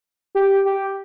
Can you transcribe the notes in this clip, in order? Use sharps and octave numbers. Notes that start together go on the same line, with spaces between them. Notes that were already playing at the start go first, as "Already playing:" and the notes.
G4
G4